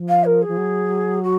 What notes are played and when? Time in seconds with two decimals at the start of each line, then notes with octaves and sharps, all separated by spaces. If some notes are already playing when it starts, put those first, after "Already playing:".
Already playing: F3
0.09 F5
0.25 A#4
0.42 G#4
0.48 F3
0.57 F#3
1.23 F#4